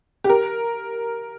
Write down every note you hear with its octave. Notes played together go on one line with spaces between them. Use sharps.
G4
A#4